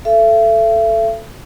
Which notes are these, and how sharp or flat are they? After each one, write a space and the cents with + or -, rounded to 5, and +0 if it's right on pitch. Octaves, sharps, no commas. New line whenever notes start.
A4 -5 E5 +40